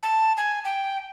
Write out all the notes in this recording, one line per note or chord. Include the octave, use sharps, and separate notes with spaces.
A5
G#5
G5